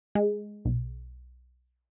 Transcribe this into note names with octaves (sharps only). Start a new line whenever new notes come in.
G#3
B1